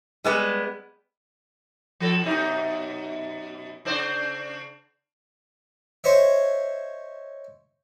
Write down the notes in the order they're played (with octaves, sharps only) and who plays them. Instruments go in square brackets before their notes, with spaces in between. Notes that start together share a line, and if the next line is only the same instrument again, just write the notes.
[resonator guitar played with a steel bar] G3 G#3 B3
[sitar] F3 A4
F#2 B2 D#4
C#3 D4 C5
[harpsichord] C5 C#5 D#5 E5